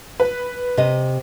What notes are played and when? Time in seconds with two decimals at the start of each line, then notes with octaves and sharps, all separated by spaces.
0.20 B4
0.77 C3 D#5